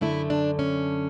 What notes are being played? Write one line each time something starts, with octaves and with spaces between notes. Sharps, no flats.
F#2 D3 A3 E4
D4
C#4